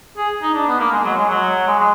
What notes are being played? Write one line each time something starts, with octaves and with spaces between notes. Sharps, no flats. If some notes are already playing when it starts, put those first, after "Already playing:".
G#4
D#4
D4
B3
A#3
G#3
F#3
G#3
F#3
G#3
G#3